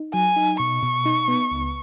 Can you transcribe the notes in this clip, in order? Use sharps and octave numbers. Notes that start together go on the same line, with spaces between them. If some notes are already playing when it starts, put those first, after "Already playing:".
Already playing: D#4
F#3 G#5
D#4
B2 C#6
B2
D#4
B3
C#2